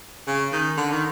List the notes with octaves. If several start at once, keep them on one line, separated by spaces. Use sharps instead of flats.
C#3
D#3
D3
D#3